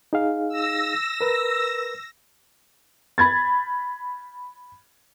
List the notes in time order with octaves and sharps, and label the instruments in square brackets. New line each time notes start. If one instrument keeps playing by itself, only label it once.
[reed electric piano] D#4 G#4 F5
[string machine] E6 A#6
[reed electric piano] A#4 B4
[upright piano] B5 G#6 A6